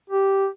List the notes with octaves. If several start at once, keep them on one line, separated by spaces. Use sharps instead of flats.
G4